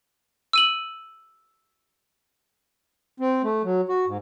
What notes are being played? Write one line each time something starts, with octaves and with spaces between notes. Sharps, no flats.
E6 D#7 F#7
C4
A3
F#3
F#4
G#2